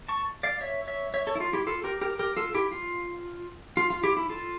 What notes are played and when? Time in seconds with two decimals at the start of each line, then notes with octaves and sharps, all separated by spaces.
0.08 A5 C#6
0.43 D5 F5
0.61 C#5 E5
0.88 C#5 E5
1.14 C#5 E5
1.27 A4 C#5
1.35 E4
1.40 F4
1.53 E4 G4
1.67 F4 A4
1.84 G4 A#4
2.01 G4 A#4
2.19 G4 A#4
2.37 F4 A4
2.54 E4 G4
2.72 F4
3.77 F4
3.90 F4
4.03 E4 G4
4.17 E4
4.29 F4 A4